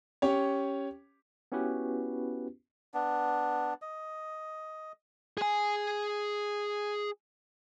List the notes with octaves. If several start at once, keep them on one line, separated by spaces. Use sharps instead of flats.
C#4 G4 C#5
B3 C#4 E4 F#4 G4 B4
B3 D4
D#5
G#4 G#5